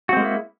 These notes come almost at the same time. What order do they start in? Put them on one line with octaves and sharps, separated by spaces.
F#4 C4 G#3 A#3 E4